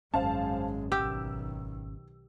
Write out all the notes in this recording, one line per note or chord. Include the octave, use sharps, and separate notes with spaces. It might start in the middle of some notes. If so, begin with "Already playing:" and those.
G#1 F#2 G#3 C#4 C5 F5 A5
B1 D#3 G4 E6